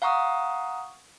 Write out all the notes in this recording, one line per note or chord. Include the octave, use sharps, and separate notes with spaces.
F5 F#5 A#5 C#6 D#6